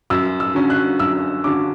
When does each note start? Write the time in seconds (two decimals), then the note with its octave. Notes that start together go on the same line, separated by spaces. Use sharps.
0.10 F#2 E6
0.40 E6
0.55 D3 F#3 C#4
0.70 F#6
1.00 F#2 E6
1.44 D3 F#3 C#4 D6